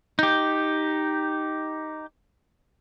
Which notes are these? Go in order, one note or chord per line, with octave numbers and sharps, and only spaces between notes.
D#4 G4